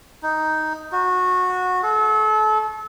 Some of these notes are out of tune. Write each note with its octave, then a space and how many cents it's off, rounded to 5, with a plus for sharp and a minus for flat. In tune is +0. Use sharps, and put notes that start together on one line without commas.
D#4 +5
F#4 -20
A4 -35